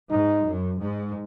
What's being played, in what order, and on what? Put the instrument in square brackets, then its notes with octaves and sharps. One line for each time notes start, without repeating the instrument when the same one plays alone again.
[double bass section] G#2 [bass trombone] D#4
[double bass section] F#2
G#2